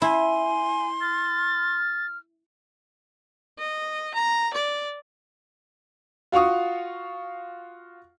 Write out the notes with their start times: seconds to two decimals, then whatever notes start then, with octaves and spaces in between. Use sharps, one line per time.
0.02 E4 G#5 C6
1.01 F6 A6
3.59 D#5
4.14 A#5
4.53 D5
6.32 F4 F#4 F5 C#6 D#6